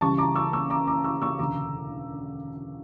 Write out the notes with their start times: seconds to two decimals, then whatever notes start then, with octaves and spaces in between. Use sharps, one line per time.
0.01 C#2 C#3 E3 G3 A5 C#6
0.18 A#5 D6
0.35 C#6 E6
0.53 C#6 E6
0.70 A#5 D6
0.87 A#5 D6
1.04 C#6 E6
1.22 C#6 E6
1.39 E1 D2 C#3 A#5 D6